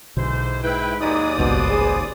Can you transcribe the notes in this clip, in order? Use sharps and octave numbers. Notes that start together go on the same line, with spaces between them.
B1 G#2 B2 D3 E3 C5
G#2 E4 B4 G5
D#2 G#2 F#3 G#3 D#4 D5 D#6
G#1 C#2 G2 B2 B4 C5
G#4